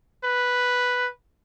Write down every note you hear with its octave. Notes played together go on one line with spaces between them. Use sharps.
B4